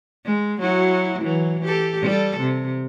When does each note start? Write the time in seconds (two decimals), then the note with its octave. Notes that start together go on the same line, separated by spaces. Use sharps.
0.24 G#3
0.61 F#3 E4 F#4
1.22 E3 F#3
1.65 G4 A4
2.01 G3 A4
2.40 C3